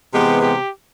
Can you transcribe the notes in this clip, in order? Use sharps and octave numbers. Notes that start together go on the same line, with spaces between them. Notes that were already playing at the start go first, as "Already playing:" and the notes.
C3 E3 G#3 B3 G4
G4